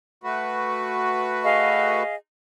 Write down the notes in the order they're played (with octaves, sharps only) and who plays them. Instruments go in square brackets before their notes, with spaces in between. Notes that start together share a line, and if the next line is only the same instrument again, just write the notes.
[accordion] A3 F#4 B4
[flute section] G#4 D#5 F5